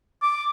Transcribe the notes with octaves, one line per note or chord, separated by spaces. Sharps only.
D6